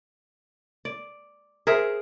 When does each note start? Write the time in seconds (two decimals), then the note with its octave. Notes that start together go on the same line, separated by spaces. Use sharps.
0.85 D5
1.67 G#4 A#4 C5 E5